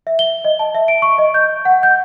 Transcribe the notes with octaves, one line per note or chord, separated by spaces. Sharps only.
E5
G7
D#5
A5
E5
D7
C#6
D#5
G6
F#5
G6